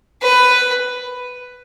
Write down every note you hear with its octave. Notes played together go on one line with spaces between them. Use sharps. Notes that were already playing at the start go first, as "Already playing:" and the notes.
B4